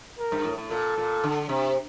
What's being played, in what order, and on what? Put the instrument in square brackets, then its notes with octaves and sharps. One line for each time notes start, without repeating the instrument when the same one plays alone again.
[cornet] A#4
[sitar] G2
A2
A2
[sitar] A#2 [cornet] A4
[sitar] A#2
D3
C3